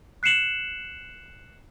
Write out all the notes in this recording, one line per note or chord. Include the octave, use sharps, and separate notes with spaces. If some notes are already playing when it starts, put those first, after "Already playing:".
F#6 C7 C#7 E7 F#7